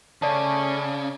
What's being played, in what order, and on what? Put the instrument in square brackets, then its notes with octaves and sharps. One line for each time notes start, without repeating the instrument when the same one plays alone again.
[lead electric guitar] C#3 [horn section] A3 C#4 [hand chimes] D5 A5